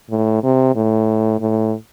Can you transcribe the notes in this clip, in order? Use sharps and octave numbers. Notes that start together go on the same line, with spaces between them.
A2
C3
A2
A2